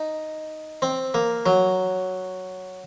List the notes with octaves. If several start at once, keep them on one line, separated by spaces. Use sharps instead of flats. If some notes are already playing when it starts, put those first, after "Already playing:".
Already playing: D#4
C4
A#3
F#3